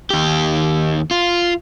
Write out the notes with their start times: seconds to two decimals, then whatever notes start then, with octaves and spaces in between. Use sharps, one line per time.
0.10 D#2 G4
1.11 F4